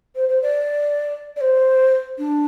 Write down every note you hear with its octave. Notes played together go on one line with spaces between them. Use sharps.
C5
C5
D5
D5
C5
D4